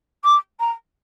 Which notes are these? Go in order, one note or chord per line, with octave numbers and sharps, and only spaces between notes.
D6
A#5